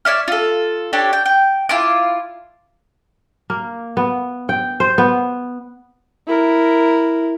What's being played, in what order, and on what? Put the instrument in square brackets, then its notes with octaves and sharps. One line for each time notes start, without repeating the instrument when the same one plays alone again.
[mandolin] C#5 D5 E5 F6
F4 A4
D4 G4 A4 C#5
G5
G5
E4 F4 A5 D6
[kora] A#3
B3
G5
C5
B3
[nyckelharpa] E4 A#4